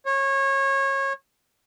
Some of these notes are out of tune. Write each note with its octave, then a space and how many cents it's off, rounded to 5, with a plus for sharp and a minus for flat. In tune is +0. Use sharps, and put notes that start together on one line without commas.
C#5 -25